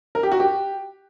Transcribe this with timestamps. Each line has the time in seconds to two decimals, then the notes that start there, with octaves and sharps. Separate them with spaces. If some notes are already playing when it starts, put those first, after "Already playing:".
0.15 A#4
0.23 G4
0.32 F#4
0.40 G4